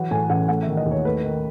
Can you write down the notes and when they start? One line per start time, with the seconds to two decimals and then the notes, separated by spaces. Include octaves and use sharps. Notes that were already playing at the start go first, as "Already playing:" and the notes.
Already playing: E3 F#3 F#5
0.11 A2 G#5
0.30 A1 F#5
0.48 A3 F#5
0.63 D#3 E5
0.77 D#5
0.86 D#2
0.91 C#5
1.05 A3 B4
1.24 D#3